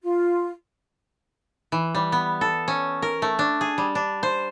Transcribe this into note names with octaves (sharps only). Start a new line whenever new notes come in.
F4
E3
G3
B3
A4
C#4
A#4
A3
D4
G#4
G3
D4
C5